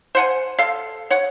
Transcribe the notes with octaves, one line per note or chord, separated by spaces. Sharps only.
C5 F#5 G#5
A4 F5
C#5 F#5